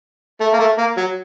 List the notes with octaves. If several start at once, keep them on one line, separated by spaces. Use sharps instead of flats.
A3
A#3
A3
A#3
F#3